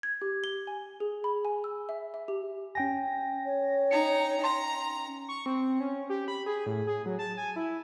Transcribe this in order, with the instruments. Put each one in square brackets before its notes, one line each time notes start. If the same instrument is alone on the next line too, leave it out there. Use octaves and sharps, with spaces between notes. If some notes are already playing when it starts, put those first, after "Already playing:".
[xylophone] G#6
G4
G7
G#5
G#4
B5
G#5
E6
E5
E5
G4
[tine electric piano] C#4 G5 G#5 [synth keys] A#6
[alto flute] C#5
[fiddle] D#4 A#5 [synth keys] C#7
[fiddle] A#5 [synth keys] C6
[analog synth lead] C#6
C4
C#4
G4
B5
G#4
A2
G#4
F#3
A5
G#5
E4